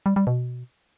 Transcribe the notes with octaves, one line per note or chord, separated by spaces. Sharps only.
G3
G3
B2